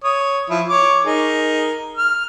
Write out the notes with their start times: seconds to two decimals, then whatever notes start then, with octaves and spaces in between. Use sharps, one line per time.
0.04 C#5 D#6
0.50 F3 E4
0.69 C#5 D6
1.05 D#4 G#4 A#4
1.97 F6